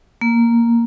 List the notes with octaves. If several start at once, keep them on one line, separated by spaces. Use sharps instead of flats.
A#3